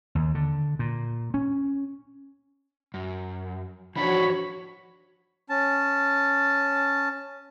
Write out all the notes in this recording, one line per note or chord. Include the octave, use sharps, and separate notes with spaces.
D#2
D3
A#2
C#4
F#2
E3 F3 D4 D#4 F#4 C#5 B5
C#4 A5